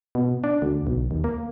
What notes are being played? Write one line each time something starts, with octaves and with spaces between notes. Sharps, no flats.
B2
D4
D2
B1
D#2
A#3